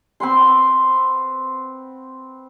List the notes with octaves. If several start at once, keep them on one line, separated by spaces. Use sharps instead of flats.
C4 B4 F#5 C6